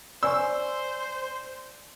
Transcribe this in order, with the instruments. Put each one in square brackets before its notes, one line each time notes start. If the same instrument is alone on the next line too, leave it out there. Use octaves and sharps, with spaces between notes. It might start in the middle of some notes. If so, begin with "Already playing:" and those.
[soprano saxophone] C5 [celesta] D5 G#5 C#6 [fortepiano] E6